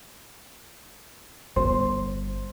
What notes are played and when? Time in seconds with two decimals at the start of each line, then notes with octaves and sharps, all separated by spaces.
1.56 G1 C5